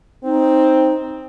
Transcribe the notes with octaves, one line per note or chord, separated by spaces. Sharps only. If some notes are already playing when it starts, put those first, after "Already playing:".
C4 D#4